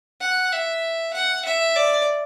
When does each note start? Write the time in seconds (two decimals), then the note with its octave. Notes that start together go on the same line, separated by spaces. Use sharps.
0.21 F#5
0.52 E5
1.14 F#5
1.45 E5
1.76 D5